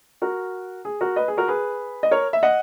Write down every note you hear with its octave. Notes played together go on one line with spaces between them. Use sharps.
F#4 A#4
G#4
F#4 A#4
B4 D#5
G#4
F#4 A#4
G#4 B4
D#5
A#4 C#5
E5
D#5 F#5